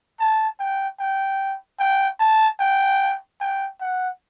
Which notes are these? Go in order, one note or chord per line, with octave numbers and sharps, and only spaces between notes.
A5
G5
G5
G5
A5
G5
G5
F#5